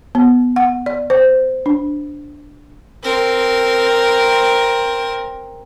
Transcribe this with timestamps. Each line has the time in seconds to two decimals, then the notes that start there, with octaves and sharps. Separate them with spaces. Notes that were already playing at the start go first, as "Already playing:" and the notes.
0.15 B3
0.56 F#5
0.86 D5
1.10 C5
1.66 D4
3.04 C4 A#4